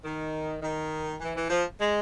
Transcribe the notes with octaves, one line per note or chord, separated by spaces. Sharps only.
D#3
D#3
E3
E3
F3
G#3